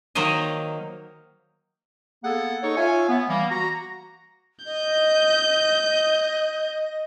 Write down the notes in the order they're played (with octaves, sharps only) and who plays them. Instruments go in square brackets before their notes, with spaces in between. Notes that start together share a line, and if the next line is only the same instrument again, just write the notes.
[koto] D#3 F#3 A#3 C5 D#5
[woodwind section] A#3 B3 G#4 A4 F#5
D#4 A4 C#5 C#6
F4 C#5 E5 G#5
B3
E3 G3 A#3
F#4 A#5
[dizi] D#5 [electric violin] G6